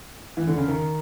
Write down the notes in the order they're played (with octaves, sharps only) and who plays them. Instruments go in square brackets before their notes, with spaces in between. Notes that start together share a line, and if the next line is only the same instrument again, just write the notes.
[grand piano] E3
D3
C#3
D#3